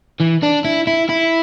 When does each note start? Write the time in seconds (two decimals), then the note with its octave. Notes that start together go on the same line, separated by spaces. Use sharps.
0.20 E3
0.43 D4
0.65 E4
0.87 E4
1.09 E4